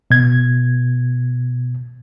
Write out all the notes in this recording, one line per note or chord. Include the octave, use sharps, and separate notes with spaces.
B2 G#6